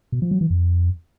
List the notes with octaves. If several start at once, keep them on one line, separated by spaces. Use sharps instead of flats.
B2
F3
F#3
E3
F2